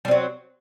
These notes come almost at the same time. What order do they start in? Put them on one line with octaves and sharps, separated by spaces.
G3 C4 F#3